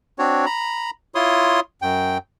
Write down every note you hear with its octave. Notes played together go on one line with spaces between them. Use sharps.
C4 D4 F#4 C#5
A#5 B5
E4 F4 C#5 C6 D#6
F#2 G5